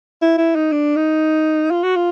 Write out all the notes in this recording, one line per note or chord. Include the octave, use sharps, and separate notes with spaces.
E4
E4
D#4
D4
D#4
F4
F#4
F4